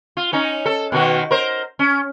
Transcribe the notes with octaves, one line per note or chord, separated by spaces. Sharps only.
F4
C#4 D#4
A4
B2 D#3 F#4
A#4 C5
C#4